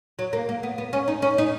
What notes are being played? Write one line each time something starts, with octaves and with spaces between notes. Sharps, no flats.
F#3
A#3
A#3
B3
B3
C#4
D#4
C#4
D#4